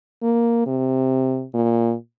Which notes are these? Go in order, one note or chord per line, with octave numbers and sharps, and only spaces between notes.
A#3
C3
A#2